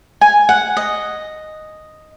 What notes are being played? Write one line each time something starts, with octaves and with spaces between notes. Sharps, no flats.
G#5
F#5
D#5